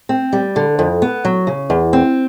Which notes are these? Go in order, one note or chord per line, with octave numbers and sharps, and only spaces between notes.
C4
G3
D3
F2
B3
F#3
C#3
E2
C4